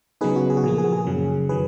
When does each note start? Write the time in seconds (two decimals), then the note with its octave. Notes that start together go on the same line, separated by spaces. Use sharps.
0.21 C#3 F#3 B3 D#4 G#4 B4
0.36 F#4
0.50 G#4
0.57 F#4
0.64 A#2 F3 A#3 G#4
0.78 G#4
0.93 G#4
1.07 F#2 C#3 F#3
1.49 D#3 F#3 G#4 B4